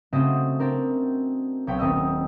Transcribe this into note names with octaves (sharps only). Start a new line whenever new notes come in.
C#3 A3 C4 F#4 C5 D#5
C4 D4 A#4
B1 C#5 G5 B6
D#1 C4 D#5 E6